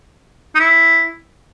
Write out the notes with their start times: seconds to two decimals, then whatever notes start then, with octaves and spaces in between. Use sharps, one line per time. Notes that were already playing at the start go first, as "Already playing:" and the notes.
0.55 D#4
0.60 E4